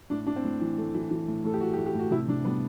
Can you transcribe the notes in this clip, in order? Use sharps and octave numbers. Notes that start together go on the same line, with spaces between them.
A2 D4
A2 D4
C4
A2
E3
A3
E3
E3
A2
A2 A4
G4
A2 F#4
G4
A2
G4
A2 F#4
C3 E4
C3 D4
G3 B3